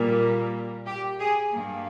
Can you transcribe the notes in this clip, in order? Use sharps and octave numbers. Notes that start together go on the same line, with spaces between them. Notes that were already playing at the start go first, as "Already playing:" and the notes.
Already playing: A#2 G3 A#3
G4
G#4
G2 G3 A#3